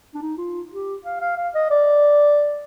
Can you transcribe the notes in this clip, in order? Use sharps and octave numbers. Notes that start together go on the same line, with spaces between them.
D4
D#4
F4
G4
F5
F5
F5
D#5
D5